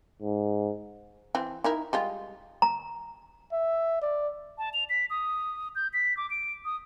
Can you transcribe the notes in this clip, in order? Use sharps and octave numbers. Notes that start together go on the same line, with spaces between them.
G#2
E3 C4
D#4 E4 A#4
G3 G#3 F4
A#5
E5
D5
A5
F7
B6
D#6
G6
B6
D6
D7
D#6